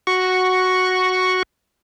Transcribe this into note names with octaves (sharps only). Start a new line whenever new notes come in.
F#4 C#6